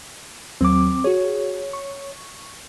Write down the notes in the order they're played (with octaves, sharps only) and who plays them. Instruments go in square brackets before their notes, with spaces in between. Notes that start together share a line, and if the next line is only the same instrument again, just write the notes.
[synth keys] D#2 F#3 [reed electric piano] C4 D6
[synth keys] F#4 G#4 [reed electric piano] C#5
[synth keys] C#6